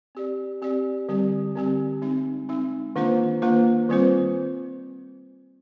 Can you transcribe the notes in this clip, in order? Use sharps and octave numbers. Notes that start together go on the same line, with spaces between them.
C4 G4 D5
C4 G4 D5
D3 G3 C4 G4
D3 G3 C4 G4
G#3 C4 D#4
G#3 C4 D#4
D#3 A#3 D4 F4 C5
D#3 A#3 D4 F4 C5
D#3 G3 C4 F4 C5